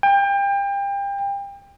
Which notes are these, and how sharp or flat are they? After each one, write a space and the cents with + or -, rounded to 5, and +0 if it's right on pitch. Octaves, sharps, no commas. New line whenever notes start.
G5 +30